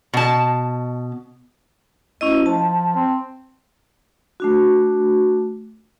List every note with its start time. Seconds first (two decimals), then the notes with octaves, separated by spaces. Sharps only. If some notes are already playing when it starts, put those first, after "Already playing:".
0.14 B2 A5
2.21 D2 C#4 E4 D#5
2.46 F3 A5
2.95 C4
4.40 A3 D4 F#4